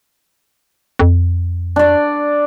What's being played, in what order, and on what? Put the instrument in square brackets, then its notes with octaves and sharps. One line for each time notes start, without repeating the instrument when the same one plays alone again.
[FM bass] F2
[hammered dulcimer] D4 D5